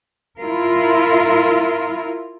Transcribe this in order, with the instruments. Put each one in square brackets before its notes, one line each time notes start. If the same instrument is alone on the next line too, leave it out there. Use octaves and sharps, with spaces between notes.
[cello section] E4 F4 A#4